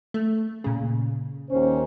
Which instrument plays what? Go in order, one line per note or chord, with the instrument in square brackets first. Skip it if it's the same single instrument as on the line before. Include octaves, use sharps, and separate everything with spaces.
[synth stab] A3
A#2 C#3
[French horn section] D#2 C#4 C5